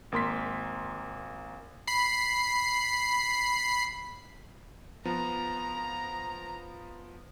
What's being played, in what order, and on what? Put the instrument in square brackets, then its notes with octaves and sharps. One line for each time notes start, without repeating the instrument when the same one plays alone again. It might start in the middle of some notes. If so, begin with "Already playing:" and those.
[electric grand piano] G#1 A#3 C6 B6
[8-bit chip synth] B5 C7
[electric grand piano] F3 B3 [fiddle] A#5